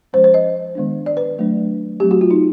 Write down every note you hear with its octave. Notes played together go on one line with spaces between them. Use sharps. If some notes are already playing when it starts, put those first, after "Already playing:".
F3 G#3 C#4 C5
C5
D#5
D#3 G#3 B3 D4
D5
B4
F#3 A3 D4
F#3 A3 C4 G4
F#4
F4
D#4